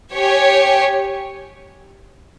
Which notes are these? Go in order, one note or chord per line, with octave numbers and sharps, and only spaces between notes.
G4 C#5 G#5